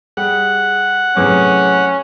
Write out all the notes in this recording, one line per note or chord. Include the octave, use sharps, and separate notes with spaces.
G3 G4 G#4 F#5
F#2 A2 C3 C#4 G#4 B4 D6